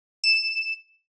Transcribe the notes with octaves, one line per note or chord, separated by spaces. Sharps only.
E7